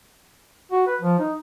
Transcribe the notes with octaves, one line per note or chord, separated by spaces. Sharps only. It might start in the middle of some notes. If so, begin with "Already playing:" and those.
F#4
B4
F3
D#4